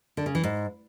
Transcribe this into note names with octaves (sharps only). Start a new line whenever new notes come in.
D3
C#3
E3
G#2